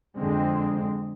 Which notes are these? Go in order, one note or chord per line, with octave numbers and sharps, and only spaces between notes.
F2 D3 G#3 C4